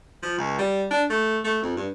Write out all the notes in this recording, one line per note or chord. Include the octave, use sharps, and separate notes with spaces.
F3
C#2
G3
D4
A3
A3
F2
G2